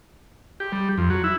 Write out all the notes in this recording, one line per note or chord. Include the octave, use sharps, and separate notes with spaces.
G4
G3
F2
F#3
E4